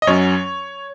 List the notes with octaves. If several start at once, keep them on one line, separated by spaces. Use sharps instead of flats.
D#5
F#2 F#3 C#4 C#5